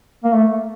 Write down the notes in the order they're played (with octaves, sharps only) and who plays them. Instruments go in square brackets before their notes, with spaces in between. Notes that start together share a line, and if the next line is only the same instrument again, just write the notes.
[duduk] A#3
A3